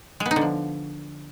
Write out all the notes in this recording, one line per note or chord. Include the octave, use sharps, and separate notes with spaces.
G#3
B3
D#4
D3
F3